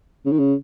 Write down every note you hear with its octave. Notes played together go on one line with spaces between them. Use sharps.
C#3
D#3
C#3